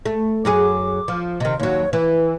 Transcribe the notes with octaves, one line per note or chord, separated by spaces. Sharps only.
A3
F#2 F#3 G#4 D6
F3
C3 D#3 D#5
D#2 F#3 C#5
E3 B4